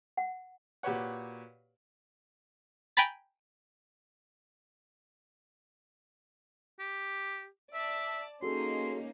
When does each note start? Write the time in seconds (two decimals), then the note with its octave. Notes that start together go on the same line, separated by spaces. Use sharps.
0.17 F#5
0.83 A#2 F#4 G4 B4 C#5 F#5
2.97 G5 G#5 A#5 B5 A6
6.80 G4
7.74 D5 E5 A5
8.43 A#3 C#4 D#4 F#4 G#4 A4 C6